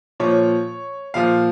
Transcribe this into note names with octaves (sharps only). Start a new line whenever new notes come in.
A#2 F3 C#5
A#2 F3 F5